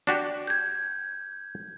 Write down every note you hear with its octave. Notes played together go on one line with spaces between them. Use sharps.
D4 F#4 G4
G6 G#6